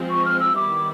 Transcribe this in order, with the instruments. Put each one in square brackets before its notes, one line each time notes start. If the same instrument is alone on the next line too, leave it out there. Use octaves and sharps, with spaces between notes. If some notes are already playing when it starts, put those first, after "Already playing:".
Already playing: [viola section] F3 G#3 C4
[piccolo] C#6
F6
E6
[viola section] D#3 G3 B3 E4 [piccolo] D6